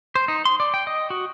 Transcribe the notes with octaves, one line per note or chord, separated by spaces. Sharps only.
C5
D#4
C6
D5
G5
D#5
F#4